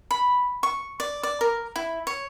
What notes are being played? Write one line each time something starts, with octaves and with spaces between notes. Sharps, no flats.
B5
C#6
D5
D5
A#4
E4
C#5